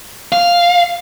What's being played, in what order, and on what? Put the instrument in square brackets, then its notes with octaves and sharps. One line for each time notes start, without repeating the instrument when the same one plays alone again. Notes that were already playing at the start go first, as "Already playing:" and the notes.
[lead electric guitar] F5